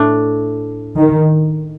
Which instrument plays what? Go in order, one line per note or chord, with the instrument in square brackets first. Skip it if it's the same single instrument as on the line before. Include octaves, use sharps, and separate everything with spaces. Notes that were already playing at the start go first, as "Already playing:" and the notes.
Already playing: [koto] A2 A3 D4
[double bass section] D#3